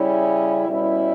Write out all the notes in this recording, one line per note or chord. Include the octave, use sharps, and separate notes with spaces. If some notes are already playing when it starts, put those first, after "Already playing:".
Already playing: C#3 G3 C#4 E4
B2 G3 C#4 E4